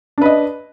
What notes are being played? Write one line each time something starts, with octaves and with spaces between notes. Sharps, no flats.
D4 B4 D#5